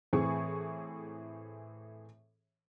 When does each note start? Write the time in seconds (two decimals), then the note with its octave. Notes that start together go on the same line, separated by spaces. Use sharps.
0.13 A2 E3 C4 G#4 C#6